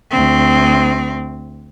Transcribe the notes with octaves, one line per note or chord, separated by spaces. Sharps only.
D2 C4